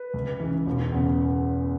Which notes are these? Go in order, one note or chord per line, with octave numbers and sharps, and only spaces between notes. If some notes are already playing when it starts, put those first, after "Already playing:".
Already playing: B4
C#2
C#3 E3
E1
E2 C#3